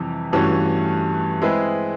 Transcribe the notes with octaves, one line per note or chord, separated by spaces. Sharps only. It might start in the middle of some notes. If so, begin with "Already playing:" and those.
Already playing: F2 C3 E3 G3
G2 E3 A3 C#4 F#4
G#3 C4 E4 G#4 B4